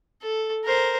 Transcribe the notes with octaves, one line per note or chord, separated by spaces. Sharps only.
A4
A#4 C5